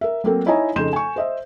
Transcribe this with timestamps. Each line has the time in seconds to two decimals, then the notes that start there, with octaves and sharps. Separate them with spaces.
0.01 A#4 E5
0.24 F#3 A3 A#3 C4 A4 A#4
0.46 D#4 E4 C#5 D#5 G#5 A#5
0.76 F2 C#3 D#4 C6 G6 E7
0.93 G#5 C#6
1.16 C5 D#5 E5